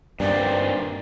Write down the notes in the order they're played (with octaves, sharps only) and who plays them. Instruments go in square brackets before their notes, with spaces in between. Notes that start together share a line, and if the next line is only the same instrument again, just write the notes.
[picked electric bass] G2 [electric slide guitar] A#2 D#3 C4 [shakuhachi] D5